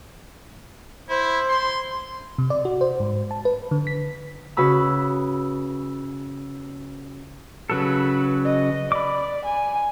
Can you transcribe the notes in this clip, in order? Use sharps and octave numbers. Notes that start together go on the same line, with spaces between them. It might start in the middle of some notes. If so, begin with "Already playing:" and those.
E4 C5
C6
C3
D5
F#4
C5
G#2
A5
B4
D3
B6
C#3 F#4 B4 B5 E6
C#3 F#3 A4 B4
D#5
D5 B5 D6
G#5